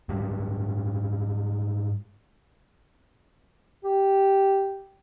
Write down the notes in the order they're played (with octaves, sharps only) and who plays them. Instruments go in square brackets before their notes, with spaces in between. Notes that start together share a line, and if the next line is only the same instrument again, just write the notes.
[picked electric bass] G#2 F#3 G3
[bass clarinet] G4